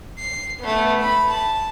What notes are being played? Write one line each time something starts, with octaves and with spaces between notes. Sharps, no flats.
C7
A3 B3
B5
A5